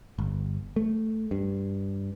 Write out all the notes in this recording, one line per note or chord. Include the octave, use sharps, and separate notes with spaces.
G1
A3
G2